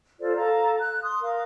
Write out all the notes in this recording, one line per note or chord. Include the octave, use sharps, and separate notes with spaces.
F4 A4 C5 D5
A4 F5 A#5
F#6
C6 D#6
A#4 F5